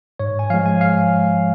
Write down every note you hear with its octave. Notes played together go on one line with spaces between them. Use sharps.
G#2 C#5
G#5
F3 G#3 F5
G#5
F5